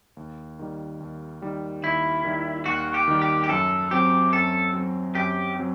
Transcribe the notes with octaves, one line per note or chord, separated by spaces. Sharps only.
D#2
D#3 G3
D#2
D#3 G3
D#2 E4
D#3 G3
D#2 F#4
G4
D#3 G3
G4
G4
F#2 A4
F#3 C4 G4
F#2 A4
F#3 C4
F#2 G4
F#3 C4